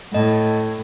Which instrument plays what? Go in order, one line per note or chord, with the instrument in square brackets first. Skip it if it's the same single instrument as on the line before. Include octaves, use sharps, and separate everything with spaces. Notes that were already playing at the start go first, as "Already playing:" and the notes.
[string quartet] A2 [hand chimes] D#5